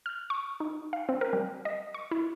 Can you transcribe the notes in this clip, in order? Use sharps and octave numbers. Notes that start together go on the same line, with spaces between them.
F6
C#6
D#4
F5
C4
A#4
G3
D#5
C#6
E4